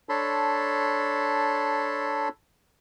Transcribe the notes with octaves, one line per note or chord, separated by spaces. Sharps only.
D4 A4 C#5 A5 B5 C6